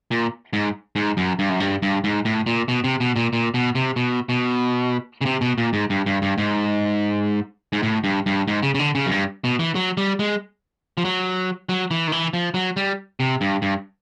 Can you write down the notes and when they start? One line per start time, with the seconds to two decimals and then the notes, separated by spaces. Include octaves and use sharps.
0.11 A#2
0.53 G#2
0.96 G#2
1.17 F#2
1.39 G2
1.49 F#2
1.60 G2
1.83 G2
2.04 G#2
2.25 A2
2.46 A#2
2.68 B2
2.84 C3
3.00 B2
3.16 A#2
3.33 A#2
3.54 B2
3.75 C3
3.96 B2
4.29 B2
5.21 C#3
5.26 C3
5.41 B2
5.58 A#2
5.73 G#2
5.90 G2
6.06 G2
6.22 G2
6.38 G#2
7.73 G#2
7.82 A2
8.04 G2
8.26 G2
8.48 G#2
8.63 C#3
8.75 C#3
8.79 D3
8.95 C#3
9.07 F#2
9.11 G2
9.44 B2
9.59 E3
9.75 F#3
9.97 G3
10.19 G#3
10.97 F3
11.05 F#3
11.69 F#3
11.91 E3
12.07 D#3
12.12 E3
12.34 F3
12.54 F#3
12.77 G3
13.20 C3
13.41 G2
13.62 G2